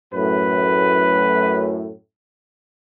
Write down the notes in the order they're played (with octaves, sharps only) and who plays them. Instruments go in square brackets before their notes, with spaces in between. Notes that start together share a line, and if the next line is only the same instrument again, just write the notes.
[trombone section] F#2 A2 [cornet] B4